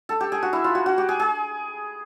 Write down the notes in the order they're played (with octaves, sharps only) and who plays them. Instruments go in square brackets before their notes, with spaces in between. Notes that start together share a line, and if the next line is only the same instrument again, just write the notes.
[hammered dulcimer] A4
G4
G#4
F#4
E4
F4
F#4
F#4
G4
G#4
G#4